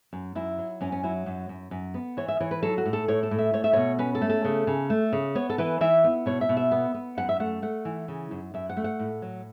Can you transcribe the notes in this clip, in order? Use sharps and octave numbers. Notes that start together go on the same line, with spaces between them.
F#2
F#2 E4
F#3
F#2 C#4
C#4
F#3 E4
F#2
F#2
F#2
B3
E3 C#5
E5
E3 C#5
B4
F#3 A4
F#4
A2
A4
A2 C#5
A4
A2
E5
A3 C#5
E5
B2 C#5
C#4 B4
A4
A3
A4
C#3
C#3
A3
C#3
B3 C#5
A4
E3 B4
E3 E5
B3
B2 C#5
E5
B2
E5
B3
B3
F#2 F#5
E5
A3 F#5
A3 F#5
E3
C#3
F#2
F#2 E5
F#5
A3
F#5
A2
F#3